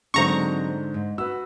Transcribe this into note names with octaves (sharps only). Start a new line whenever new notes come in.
G#2 D3 F#3 G#3 C4 C5 A#5 C#6
G#2
F#4 B4 E6